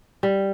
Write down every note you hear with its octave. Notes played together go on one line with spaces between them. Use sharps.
G3